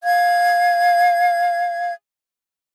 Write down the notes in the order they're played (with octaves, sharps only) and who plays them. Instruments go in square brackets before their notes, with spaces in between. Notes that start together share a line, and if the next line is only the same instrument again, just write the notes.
[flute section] F5 G#6